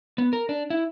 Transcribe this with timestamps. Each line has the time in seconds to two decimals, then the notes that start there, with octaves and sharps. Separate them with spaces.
0.18 B3
0.33 A#4
0.49 D4
0.70 E4